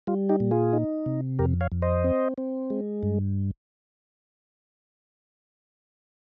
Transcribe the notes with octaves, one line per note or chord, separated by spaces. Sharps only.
G3 F4
D#4 G4
A#2
F4 G#4
D#4
C3
F2 G4 A#4
C#5 F5
F2
C5 D#5
C4
C4
G#3
G2